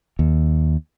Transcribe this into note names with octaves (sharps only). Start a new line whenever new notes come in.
D#2